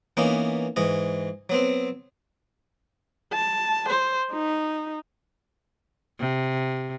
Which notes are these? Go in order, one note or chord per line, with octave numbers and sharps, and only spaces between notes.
E3 A#3 B3 C#4 D#4
G#2 E3 D#5
F#3 B3 C4
A5
C5
D#4
C3